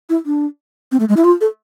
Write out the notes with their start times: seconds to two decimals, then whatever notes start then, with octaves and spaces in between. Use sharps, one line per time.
0.09 E4
0.26 D4
0.92 C4
1.00 A3
1.09 G#3
1.17 E4
1.24 F4
1.41 A4